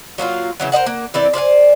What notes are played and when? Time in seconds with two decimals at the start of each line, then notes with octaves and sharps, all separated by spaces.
0.18 F#3 A#3 D4 F4
0.60 C#3 E3 F#3
0.72 A#4 C5 D#5 F#5
0.86 A#3 F#5
1.14 E3 C4 D5
1.34 C5 D5 F5 G#5